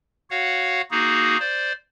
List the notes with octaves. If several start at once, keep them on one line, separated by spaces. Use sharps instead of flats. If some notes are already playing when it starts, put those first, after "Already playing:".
F#4 C#5 F5 F#5
A#3 D#4 F#4 G#4
C5 D5